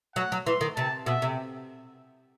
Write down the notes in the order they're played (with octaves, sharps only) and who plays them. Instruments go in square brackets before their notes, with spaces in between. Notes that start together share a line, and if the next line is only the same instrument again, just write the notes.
[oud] F#3 [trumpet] F#5
[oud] F#3
[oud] E3 [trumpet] C6
[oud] D#3
[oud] C3 [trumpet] A5
[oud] B2 [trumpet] E5
[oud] C3